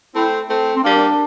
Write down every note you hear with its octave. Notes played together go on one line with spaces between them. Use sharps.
A3 C4 E4
A3 C4
C4
G3 A#3 D4